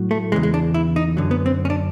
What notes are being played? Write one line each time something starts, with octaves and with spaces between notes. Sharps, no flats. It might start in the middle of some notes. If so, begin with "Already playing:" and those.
Already playing: A2 F#3
A3
E2 C#3 E3 G#3
G#3
D4
E4
D#4
F#2 D3 F#3
B3
C4
C#4
D4